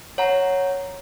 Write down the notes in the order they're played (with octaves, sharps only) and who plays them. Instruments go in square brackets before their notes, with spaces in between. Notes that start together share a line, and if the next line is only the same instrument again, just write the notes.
[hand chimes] C#5 F#5 A#5